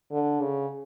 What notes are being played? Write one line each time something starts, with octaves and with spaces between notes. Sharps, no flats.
D3
C#3